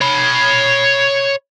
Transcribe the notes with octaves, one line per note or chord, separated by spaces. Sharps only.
C#5 B5